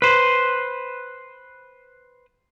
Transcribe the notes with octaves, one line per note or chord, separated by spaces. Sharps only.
B4 C5